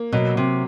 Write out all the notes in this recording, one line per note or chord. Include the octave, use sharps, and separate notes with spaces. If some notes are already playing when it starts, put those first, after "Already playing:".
Already playing: A#3
B2 F#3
C3